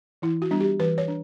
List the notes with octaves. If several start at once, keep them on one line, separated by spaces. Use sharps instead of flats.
E3 E4
F#4
G3 B3 D4
G4
E3 B4
C#5
D4